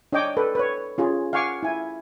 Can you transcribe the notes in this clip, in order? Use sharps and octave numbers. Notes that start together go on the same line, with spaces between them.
D4 C#5 D#5 G5 D6
A4 B4
B4 C#5
C#4 F4 G#4
F5 F#5 G#5 C#6 D6
E4 G#5